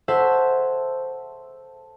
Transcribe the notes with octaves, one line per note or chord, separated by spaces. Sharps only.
A4 C5 C#5 E5 F#5 A5